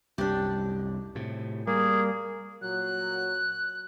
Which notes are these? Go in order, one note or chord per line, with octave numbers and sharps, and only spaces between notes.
C2 F#2 D4 G4
A2 C3
G3 A#3 G#4
A#2 F#3 F#6